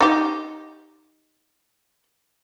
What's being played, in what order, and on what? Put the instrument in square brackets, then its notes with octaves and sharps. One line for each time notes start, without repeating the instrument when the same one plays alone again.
[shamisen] D#4 G4